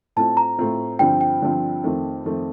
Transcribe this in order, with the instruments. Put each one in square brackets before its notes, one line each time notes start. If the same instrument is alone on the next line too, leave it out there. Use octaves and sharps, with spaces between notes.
[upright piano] A2 A3 C4 F4 [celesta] A5
[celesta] A#5
[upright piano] A2 A3 C4 F4
[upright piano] G2 D3 F3 C4 [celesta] G5
[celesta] G5
[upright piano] G2 D3 F3 C4
F2 D#3 A3 C4
F2 D#3 A3 C4